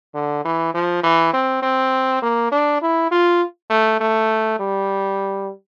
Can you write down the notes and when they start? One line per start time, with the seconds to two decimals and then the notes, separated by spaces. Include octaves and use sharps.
0.15 D3
0.45 E3
0.74 F3
1.03 E3
1.34 C4
1.63 C4
2.22 A#3
2.52 D4
2.82 E4
3.11 F4
3.70 A3
4.00 A3
4.60 G3